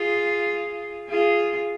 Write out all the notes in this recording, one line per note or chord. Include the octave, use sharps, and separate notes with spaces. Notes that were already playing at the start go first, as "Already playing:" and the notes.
Already playing: F4 G#4
F4 G#4